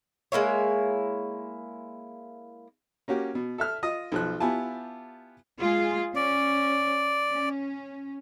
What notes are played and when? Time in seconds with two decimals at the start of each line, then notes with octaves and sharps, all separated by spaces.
0.32 G#3 A#3 E4 C#5
3.08 A#3 C#4 F#4 G4
3.35 B2
3.58 A4 E5 F6
3.83 F4 D#5 D#6
4.12 B1 F3 F#6
4.40 B3 E4 F4 G4 G#5 A5
5.60 G#3 F4 G#4
6.15 C#4 D5
7.30 C#4